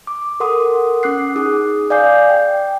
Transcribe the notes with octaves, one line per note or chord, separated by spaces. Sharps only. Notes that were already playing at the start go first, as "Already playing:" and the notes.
D6
A4 A#4 F#5 C6 D6 D#6
C#4 D6 F#6 C7
D#4 G#4 D6 D#6
D5 F5 G#5 D6 G6 C7
G5